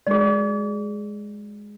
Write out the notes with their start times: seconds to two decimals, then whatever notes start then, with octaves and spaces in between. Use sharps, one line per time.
0.07 F#3 G#3 G#4 D5